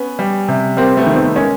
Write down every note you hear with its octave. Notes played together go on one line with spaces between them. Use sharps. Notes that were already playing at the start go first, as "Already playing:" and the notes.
Already playing: B3 C#4
G3
C3
G3 A#3 C4
A3 B3
D#3
C4
A3 B3
G#3 A#3 C#4